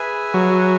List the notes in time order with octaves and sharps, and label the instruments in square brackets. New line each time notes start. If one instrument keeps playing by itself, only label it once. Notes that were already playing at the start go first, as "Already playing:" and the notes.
Already playing: [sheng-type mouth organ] G#4 B4 E5 G#5
[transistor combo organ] F#3